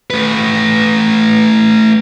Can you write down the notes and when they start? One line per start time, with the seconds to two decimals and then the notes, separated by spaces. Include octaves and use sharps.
0.10 A3 B4